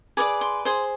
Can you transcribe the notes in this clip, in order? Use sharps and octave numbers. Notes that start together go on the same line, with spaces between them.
G#4 B4 D5 D6
C6
G#4 C5 C6